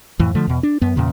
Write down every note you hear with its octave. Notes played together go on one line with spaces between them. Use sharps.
F2 A2 E3
D3 F3 A3
E2 B2
D4
F#2 B3
E2 A#2 C#3